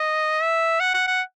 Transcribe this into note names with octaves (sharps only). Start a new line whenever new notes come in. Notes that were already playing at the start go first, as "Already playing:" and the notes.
Already playing: D#5
E5
F#5
F#5
F#5